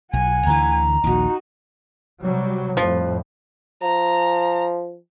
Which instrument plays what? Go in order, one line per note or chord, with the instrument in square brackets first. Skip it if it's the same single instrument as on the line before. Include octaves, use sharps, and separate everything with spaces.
[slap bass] B1 [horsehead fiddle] F#5 G#5
[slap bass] D2 D3 E3 [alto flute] A#5
[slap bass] A#1 D#2 [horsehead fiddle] D#4 F#4
[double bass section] C3 F#3 G3
[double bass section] F2 A2 [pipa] F3
[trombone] F3 [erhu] A#5